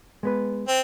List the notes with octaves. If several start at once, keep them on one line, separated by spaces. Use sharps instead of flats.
G#3 B3 B4
C4